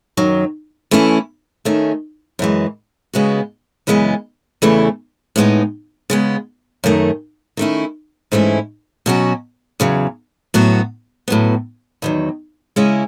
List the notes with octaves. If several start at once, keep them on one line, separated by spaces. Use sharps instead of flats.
F#2 D#3 F#3
E3 A3 C#4 E4
D#3 A3 C#4
F#2 E3 G#3
C#3 G#3 B3 F#4
F#2 C#3 E3 G#3 B3
E2 C#3 E3 A3 E4
A2 G#3 B3 D#4
C#3 G#3 B3
F#2 D#3 A3
D#3 A3 C#4 E4
G#2 E3 A3 C#4 E4
B2 F#3 C#4 F#4
E2 C#3 F#3
A2 F#3 B3 F#4
A2 F#3 B3
E2 D#3 F#3
C#3 G#3 C#4 E4